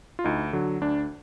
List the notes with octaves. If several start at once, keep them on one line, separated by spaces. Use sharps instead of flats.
F4
D2 D#4
D3 F#3
D2 D4